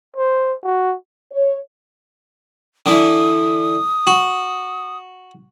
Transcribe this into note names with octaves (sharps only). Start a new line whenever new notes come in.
C5
F#4
C#5
D3 E3 D#6
F#4